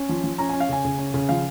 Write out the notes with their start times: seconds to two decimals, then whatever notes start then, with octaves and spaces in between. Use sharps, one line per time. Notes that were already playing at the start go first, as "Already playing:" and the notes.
Already playing: C#4
0.09 F3
0.24 F3
0.38 C#4 A#5
0.49 C#4 G#5
0.60 F5
0.69 C#3 G#5
0.85 C#3
0.99 C#4
1.14 C#3
1.29 F3 F5